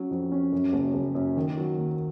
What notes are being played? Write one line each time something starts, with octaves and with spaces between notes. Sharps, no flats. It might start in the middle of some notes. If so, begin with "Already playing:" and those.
Already playing: F#3 C#4
F2
C#4
F#2
F#1
F#1
F#2
D#3
F#3
D#2